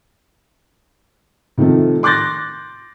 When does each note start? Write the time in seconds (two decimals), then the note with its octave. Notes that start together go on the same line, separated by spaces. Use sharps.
1.58 C3 D#3 F3 A3
2.03 C6 D6 F#6 G6 A6 A#6